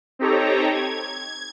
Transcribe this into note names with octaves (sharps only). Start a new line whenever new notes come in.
C4 D#4 G4 A4 C#5 A#5
G#6